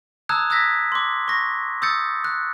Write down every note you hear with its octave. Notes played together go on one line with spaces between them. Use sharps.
A5 A#5 D#6 E6 F#6 G#6
D#6 E6 F#6 G#6 A#6 B6
C6 D6
C#6 A#6
D#6 E6 G6 A6 C#7
F#6